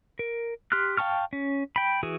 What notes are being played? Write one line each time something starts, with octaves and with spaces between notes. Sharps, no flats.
A#4
G4 C6 F6 F#6
F5 G5 A5 C#6 F6
C#4
G5 B5
E3 F#4 G#4